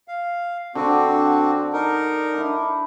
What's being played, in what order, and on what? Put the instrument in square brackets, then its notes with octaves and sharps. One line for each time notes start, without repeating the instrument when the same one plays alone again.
[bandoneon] F5
[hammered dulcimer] D3 D6 [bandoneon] C4 F#4
[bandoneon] D#4 A#4
[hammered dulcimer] D4 E4